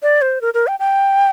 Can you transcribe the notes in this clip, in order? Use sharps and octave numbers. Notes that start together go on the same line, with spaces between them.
D5
C5
A#4
A#4
G5
G5